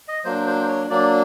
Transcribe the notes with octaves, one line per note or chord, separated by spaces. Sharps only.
D#5
F#3 A#3 D4 C5
C5
C#5
F#3 A#3 D4 D5